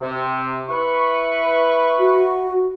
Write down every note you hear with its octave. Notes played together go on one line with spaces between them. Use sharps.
C3
E4 B4 C#6
F#4